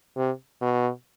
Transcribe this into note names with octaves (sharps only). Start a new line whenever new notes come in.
C3
B2